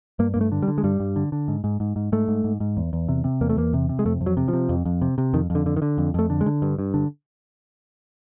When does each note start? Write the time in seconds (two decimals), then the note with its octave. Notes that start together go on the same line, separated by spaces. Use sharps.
0.19 G2 A#3
0.34 G2 A#3
0.41 A3
0.52 D3
0.63 G3
0.68 D3
0.78 G#3
0.84 G2 G3
1.00 G2
1.16 D3
1.32 D3
1.48 G#2
1.64 G#2
1.80 G#2
1.96 G#2
2.12 G#2 A3
2.28 G#2
2.44 G#2
2.60 G#2
2.77 E2
2.93 E2
3.08 C3
3.24 C3
3.41 E2 A#3
3.50 A3
3.57 E2 A#3
3.74 C3
3.89 C3
3.99 G#3
4.05 F2 A3
4.21 F2
4.26 F#3
4.37 C3
4.48 F3
4.53 C3
4.69 F2
4.85 F2
5.02 C3
5.18 C3
5.33 F2 D#3
5.50 F2
5.55 D3
5.66 D3
5.77 D#3
5.82 D3
5.98 F2
6.14 F2 A3
6.30 D3
6.41 G#3
6.46 D3
6.62 G2
6.79 G2
6.94 D3